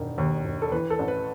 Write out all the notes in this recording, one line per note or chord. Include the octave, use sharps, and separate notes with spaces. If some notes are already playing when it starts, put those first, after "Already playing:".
Already playing: E1 D#3
D#2
E1
A4
E3 B4
A4
A1
B4